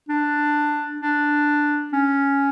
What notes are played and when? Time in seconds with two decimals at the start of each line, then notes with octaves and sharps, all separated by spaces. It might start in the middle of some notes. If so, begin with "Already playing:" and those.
0.09 D4
1.01 D4
1.93 C#4